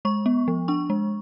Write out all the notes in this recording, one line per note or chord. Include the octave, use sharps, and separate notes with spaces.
G#3 C#6
B3
F3
D4 C#6
G#3